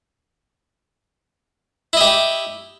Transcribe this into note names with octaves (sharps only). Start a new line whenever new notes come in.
E4 G4 D#5